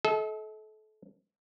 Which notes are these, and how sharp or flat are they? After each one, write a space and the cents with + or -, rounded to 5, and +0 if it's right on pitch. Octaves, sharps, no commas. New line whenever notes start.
A4 -30 D#5 +45